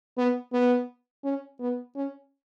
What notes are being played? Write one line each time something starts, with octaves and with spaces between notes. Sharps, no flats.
B3
B3
C#4
B3
C#4